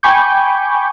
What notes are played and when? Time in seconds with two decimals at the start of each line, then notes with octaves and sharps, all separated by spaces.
0.03 G5 G#5 B5 C#6 D6 G6